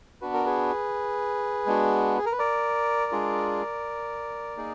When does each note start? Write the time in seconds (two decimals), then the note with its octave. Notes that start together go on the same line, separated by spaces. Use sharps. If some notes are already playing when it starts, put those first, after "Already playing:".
0.21 B3 D4 F#4 B4
0.33 A#4
0.45 G#4 B4
1.66 G#3 B3 D4 F#4
2.18 G#4
2.26 A#4
2.32 B4
2.39 A#4 D5
3.12 G#3 D4 F4 G#4
4.57 A#3 D#4 G#4